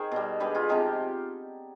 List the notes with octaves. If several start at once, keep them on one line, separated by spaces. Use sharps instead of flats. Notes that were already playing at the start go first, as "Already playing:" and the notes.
Already playing: D#3 G#4 C5
B2 G3
D3 G#3 G4 B4
F4 G#4
C3 F3 G#3 D#4 G4